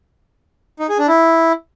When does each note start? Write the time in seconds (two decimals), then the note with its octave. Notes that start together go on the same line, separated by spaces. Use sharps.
0.80 D#4
0.89 G#4
0.99 D4
1.08 E4